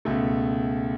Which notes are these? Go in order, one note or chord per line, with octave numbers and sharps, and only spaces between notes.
C#2 B2 A3